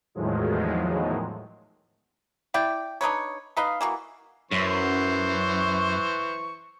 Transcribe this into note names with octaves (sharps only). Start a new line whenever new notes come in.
E2 A2 D#3 F3 F#3 G#3
E4 D5 G5
D4 D#4 B4 C#5
D#4 B4 D#5 F5
E3 A#3 F#4
F#2 E3 C5 C#6